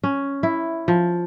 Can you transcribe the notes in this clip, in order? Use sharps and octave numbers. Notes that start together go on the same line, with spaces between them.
C#4
E4
F3